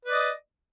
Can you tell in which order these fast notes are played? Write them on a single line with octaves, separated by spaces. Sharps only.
B4 D5 D#5